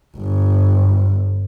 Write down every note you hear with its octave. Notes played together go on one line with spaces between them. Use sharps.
G1